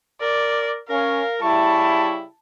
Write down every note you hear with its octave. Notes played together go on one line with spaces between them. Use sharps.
A#4 D5
C#4 A#4 F5
C#3 G3 E4 A5 C#6